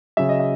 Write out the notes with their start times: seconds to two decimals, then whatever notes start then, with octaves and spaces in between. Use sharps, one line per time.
0.17 C#3 F#3 E5
0.29 D#5
0.40 E5